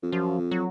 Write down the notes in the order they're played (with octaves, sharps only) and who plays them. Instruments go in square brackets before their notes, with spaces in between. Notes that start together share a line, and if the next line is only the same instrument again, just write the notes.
[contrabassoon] F2
[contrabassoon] F#2 [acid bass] F3
[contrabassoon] F2
[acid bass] F#3